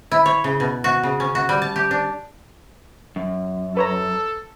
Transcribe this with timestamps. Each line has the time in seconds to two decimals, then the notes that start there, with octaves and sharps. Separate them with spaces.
0.12 E4
0.26 C#5
0.44 C#3
0.60 B2
0.84 F#4
1.03 C#3
1.20 C#4
1.35 F#4
1.49 G3
1.62 A5
1.76 G4
1.91 D4
3.16 F#2
3.77 A4 B4 C#5 A#5